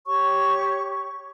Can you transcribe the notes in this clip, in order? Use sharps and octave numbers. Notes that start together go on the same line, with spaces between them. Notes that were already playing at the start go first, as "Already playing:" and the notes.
G4 C#5 C#6